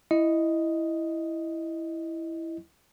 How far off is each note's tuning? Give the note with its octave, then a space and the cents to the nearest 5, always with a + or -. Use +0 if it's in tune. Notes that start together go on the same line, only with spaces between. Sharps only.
E4 +0 D#5 +0